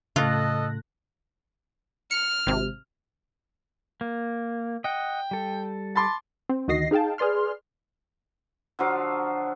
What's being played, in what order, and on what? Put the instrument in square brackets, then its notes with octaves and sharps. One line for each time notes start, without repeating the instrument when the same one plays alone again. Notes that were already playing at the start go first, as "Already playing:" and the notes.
[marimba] A2 A3 [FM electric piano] C#3 F#6 A#6 [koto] F4 [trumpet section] A4 D#5
[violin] F6 [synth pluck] C#7
[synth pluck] G#1 C3
[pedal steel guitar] A#3
[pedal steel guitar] D#5 F#5 [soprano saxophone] G5
[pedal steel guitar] G3 A4
[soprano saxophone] A5 [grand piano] B5 C6 D6
[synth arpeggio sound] C4
D2 D#3 F#4 D#5 A#6 C7
D#4 G#4 F5 G5 A5
G#4 B4 D5 C6 F6
[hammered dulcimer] D3 F3 F#3 F5